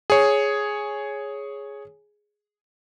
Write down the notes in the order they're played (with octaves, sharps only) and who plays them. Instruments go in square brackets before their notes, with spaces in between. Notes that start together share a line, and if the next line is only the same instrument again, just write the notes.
[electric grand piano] G#4 C#5